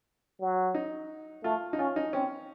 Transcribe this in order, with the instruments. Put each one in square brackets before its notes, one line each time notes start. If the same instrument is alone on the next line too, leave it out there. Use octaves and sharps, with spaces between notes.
[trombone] F#3
[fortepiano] D#4
[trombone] A3 [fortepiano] F4
[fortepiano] D#4
[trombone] C#4 [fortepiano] F4
[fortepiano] D#4
[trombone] C4 [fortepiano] C#4